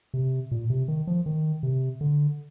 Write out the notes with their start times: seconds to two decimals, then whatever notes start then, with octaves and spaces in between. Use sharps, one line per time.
0.14 C3
0.51 A#2
0.70 C3
0.88 D#3
1.07 F3
1.26 D#3
1.63 C3
2.01 D3